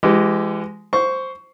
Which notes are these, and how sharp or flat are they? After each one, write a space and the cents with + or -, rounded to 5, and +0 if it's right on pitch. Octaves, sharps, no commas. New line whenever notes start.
E3 +35 G#3 +0 G4 -15
C5 +0 C#6 +15